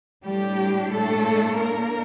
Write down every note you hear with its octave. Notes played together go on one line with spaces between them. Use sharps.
A2 G3 A3 D4 G4
A3 A4
A#3 A#4